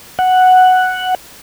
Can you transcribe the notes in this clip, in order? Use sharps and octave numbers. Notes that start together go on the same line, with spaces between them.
F#5